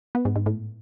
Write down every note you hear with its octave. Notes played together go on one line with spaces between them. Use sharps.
B3
G#2
G#2
A2